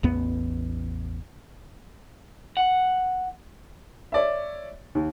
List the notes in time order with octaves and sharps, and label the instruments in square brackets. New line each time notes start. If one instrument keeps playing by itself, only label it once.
[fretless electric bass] A1 E2 B3
[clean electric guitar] F#5
[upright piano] C#5 D5 E5
D#2